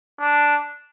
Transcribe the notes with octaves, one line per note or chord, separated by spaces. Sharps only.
D4